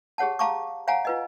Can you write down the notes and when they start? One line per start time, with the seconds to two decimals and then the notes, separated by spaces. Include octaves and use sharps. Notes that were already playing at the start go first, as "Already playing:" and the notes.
0.18 G4 G#4 C#5 F#5 A5
0.39 F5 A5 A#5 C#6 D6
0.87 C#5 F5 F#5 G#5 A#5
1.05 F4 B4 D#5